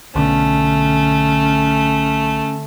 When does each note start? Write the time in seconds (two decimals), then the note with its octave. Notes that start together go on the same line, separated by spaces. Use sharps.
0.15 B1 D3 A3 C#4